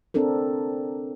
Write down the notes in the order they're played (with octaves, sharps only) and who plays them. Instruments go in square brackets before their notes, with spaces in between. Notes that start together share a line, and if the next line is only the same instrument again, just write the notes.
[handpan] C4 D4 A4 A#4